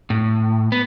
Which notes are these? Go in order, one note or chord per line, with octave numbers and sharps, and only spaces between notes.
A2
B3